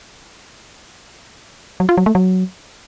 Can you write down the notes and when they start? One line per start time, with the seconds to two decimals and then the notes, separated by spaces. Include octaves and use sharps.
1.80 F#3
1.89 F4
1.97 F#3
2.06 A3
2.15 F#3